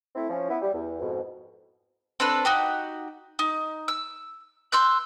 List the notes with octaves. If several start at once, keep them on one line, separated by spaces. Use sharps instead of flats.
A3 C4 E4
F3 C#4
B3 E4
G3
E2
F2 G#2 B2
C4 D4 A4 B4
D#4 F#4 G4
D#4
E6
C6 E6 F#6 G6